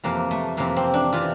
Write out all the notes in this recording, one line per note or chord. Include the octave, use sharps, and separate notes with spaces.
F2 C3 E3 A#3
A3
F2 C3 E3 A#3
C4
D4
C3 E3 F4